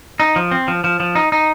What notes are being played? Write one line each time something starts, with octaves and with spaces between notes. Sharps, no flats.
D#4
F3
C4
F3
F3
F3
D#4
D#4